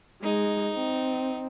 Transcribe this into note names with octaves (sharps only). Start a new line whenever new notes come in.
G#3 D#4
C4